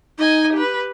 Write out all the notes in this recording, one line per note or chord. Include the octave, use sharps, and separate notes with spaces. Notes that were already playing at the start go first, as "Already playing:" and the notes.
D#4 D#5 G#5
G4 B4